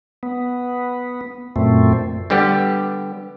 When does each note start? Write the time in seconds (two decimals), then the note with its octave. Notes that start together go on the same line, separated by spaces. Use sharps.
0.23 B3
1.56 F#2 A#2 A3 C4
2.30 D3 G3 B3 G4